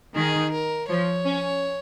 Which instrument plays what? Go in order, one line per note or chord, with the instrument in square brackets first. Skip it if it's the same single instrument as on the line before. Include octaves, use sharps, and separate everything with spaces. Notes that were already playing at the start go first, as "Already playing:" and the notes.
[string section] D#3 [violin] G#4
[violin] A#4
[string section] F3 [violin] C#5
[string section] C#4